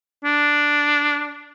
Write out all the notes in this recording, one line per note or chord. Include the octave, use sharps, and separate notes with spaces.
D4